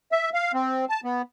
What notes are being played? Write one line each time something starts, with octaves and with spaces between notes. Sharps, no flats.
E5
F5
C4
A5
B3